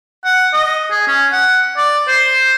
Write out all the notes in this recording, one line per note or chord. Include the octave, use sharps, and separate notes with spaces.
F#5
D#5
G#4
C#4
F#5
D5
C5